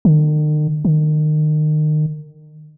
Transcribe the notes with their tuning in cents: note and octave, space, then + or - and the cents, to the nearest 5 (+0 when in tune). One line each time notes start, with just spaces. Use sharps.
D#3 -45
D#3 -30